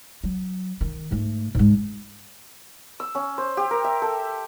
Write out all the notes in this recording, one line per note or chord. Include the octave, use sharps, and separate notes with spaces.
F#3
D#3
G#2 A3
G#2 G#3
E6
C#4
C5
G4
A#4
E5
A4